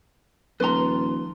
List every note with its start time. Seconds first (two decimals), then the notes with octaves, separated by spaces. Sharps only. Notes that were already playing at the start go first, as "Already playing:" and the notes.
0.60 D#1 F3 F4 B4 A#5 C6